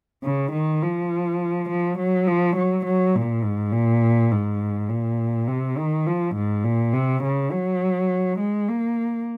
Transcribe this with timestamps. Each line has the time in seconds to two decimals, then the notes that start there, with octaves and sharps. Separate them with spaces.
0.23 C#3
0.52 D#3
0.82 F3
1.69 F3
1.98 F#3
2.27 F3
2.56 F#3
2.85 F#3
3.15 A#2
3.43 G#2
3.72 A#2
4.32 G#2
4.89 A#2
5.48 C3
5.78 D#3
6.07 F3
6.35 G#2
6.64 A#2
6.93 C3
7.23 C#3
7.52 F#3
8.39 G#3
8.69 A#3